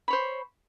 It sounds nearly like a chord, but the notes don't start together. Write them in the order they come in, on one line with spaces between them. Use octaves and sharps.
B5 C#5 C5